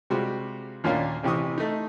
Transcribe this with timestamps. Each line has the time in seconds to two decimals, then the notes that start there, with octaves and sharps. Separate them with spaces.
0.10 C3 G3 G#3 F4 F#4
0.84 D#2 A#2 A#3 C#4 D4 F5
1.23 A1 C3 E3 G4 C#6 D#6
1.58 A3 D#4